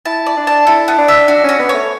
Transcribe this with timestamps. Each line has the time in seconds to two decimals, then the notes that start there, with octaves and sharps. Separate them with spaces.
0.05 E4 A5
0.26 D5
0.37 D4
0.47 A5
0.67 E4 A4
0.88 B3
0.98 D4
1.08 E5
1.28 D4 F#4
1.44 C#4 F#4
1.59 B3
1.69 A3 C#5